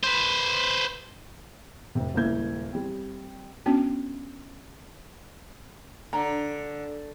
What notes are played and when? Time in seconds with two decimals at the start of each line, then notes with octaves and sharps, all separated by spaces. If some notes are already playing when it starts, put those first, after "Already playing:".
0.03 B4 C5
1.95 F1 C3
2.14 D#1 C#2 A#3 E4 G6 G#6
2.73 G3 C4
3.66 B3 C#4 D4 F#4
6.13 D3 A#5